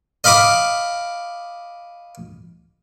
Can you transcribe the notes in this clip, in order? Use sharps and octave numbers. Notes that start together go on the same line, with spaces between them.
D#5 F5 B5 D6 D#6